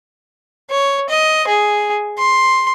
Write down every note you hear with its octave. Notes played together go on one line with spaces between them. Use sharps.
C#5
D#5
G#4
C6